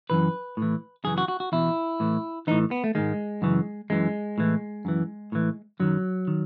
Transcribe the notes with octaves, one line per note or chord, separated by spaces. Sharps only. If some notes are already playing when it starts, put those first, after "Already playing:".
F#2 C#3 E3 B4
A2 E3
F#2 C#3 E3 G#4
F#4
F#4
F#4
E2 B2 E4
A2 E3
A2 E3 D#4
B3
A3
G#2 D#3 G#3
F#2 C#3 E3
F#2 E3 G#3
A2 E3
F#2 E3
A2 E3
F#2 D#3 F#3
D#3